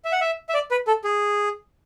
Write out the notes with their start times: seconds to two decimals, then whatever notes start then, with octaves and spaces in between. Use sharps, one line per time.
0.05 E5
0.12 F#5
0.21 E5
0.49 E5
0.54 D5
0.71 B4
0.87 A4
1.04 G#4